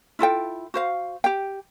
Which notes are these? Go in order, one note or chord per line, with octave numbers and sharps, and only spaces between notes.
E4 F4 A4 G5
F#4 C5 F5
G4 G5